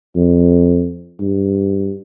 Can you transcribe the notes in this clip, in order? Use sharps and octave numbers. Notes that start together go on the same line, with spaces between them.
F2
G2